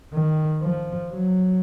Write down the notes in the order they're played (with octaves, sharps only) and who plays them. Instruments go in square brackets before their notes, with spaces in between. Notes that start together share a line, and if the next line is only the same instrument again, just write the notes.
[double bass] D#3
F3
F#3